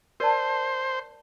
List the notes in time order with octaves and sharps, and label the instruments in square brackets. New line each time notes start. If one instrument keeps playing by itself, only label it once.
[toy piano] A#4 D5 A5 [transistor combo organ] C5